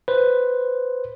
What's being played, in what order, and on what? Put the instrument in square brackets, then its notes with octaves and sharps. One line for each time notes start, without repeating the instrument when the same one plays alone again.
[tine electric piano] B4 C5